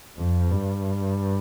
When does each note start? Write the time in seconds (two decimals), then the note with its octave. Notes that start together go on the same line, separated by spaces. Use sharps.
0.17 F2
0.51 G2